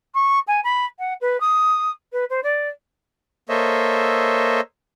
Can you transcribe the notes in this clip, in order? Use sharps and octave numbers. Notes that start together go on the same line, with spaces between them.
C#6
G#5
B5
F#5
B4
D#6
B4
C5
D5
A#3 A4 C5 C#5 D#5 E5